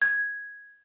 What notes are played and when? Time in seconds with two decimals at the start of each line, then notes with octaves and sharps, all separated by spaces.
0.02 G#6